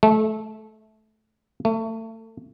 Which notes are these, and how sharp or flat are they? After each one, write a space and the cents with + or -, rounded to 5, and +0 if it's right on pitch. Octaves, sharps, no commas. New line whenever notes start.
A3 -20
A3 +30